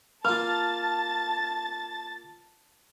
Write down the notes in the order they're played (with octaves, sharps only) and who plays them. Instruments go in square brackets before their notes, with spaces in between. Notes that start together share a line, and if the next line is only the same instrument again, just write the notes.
[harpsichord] A#3 F4 [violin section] A5 A6 [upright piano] F6